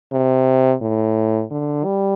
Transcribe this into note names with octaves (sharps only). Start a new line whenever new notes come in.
C3
A2
D3
G3